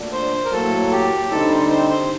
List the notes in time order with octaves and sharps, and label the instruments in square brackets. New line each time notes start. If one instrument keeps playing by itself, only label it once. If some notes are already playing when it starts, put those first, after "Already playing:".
Already playing: [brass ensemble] A#2 F#3 A3 D4
[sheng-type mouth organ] C5
A#4
[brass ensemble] A2 F#3 A#3 [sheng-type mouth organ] A4
[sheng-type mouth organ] G4
[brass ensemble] D3 G3 C4 D#4 [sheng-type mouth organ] A4
[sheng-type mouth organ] C5
C5
C5